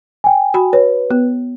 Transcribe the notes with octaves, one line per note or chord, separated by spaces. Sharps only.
G5 G#5
F#4 B5
B4 C#5
B3